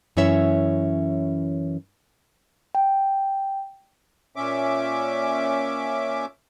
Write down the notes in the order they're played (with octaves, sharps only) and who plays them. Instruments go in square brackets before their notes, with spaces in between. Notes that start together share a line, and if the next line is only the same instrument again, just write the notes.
[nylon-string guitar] F#2 E3 C#4 E4 C#5 E5
[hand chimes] G5
[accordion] A#2 C#4 E5 D6